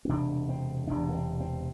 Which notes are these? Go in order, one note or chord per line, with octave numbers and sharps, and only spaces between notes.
C4
E1 D2 C3 D4
C4
E1 E2 C3 D4
A#3
C4
C4